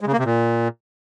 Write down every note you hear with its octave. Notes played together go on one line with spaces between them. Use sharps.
G#3
C#3
A#3
C3
A#2